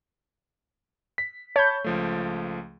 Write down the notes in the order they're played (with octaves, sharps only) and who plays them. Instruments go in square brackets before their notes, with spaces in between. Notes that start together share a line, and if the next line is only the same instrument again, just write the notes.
[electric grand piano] B6
[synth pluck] C#5 G6 [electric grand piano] A5 B5
[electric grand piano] C#2 F3 A3